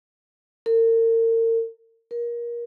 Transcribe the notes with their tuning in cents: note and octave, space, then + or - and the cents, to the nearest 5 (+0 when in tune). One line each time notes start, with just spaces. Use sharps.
A#4 -40
A#4 +25